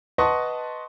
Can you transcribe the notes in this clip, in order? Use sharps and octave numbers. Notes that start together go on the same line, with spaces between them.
B4 D#5 F#5 A5 C6 C#6